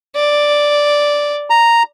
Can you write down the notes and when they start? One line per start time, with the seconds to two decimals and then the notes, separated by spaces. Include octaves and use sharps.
0.15 D5
1.50 A#5